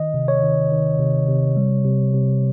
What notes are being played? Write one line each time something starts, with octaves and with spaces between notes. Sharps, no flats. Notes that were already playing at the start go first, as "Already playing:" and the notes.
Already playing: D#3 D#5
C3
C#5
D#3
D#3
C3
C3
G3
C3
C3